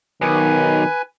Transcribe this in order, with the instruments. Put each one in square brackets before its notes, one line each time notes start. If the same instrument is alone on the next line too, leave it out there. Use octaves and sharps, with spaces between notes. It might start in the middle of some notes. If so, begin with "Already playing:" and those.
[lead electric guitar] B1 [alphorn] D#3 [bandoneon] B4 G#5